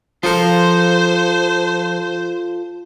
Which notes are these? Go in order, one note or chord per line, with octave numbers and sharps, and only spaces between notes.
F3 F4 A4 A#4 C5